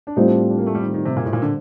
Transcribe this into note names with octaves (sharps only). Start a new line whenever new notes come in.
D4
A2 G3 C4 D#4 F4
D4
D4
A#3
A3
G3
D#3
D#3
C3
A#2
A2
A#2
D3